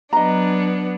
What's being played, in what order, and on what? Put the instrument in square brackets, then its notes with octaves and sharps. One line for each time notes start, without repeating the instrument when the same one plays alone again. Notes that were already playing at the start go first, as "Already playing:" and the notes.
[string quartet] F#3 B3 D4 [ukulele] D#5 A#5